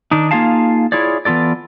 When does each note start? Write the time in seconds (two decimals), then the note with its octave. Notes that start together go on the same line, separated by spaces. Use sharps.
0.11 D#3 D4 D#4
0.31 A#3 D#4 F4 G#4 F5 A5
0.92 E4 F4 G#4 C#5 D5
1.25 E3 B3 F4 A4 D5